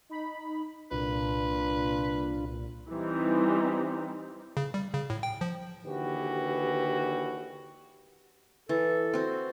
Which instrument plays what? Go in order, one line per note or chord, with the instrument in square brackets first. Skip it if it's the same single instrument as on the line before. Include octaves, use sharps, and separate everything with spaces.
[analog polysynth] D#4 B5
[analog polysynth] C2 A#2 [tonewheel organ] D4 F4 [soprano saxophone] B4
[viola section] E3 G3 C4 D#4
[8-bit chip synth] C#3
G3
C#3
A2
G5
F3
[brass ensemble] D#2 D3 E3 F#4 G4 B4
[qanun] E3 [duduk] A4
[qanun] C4 F#4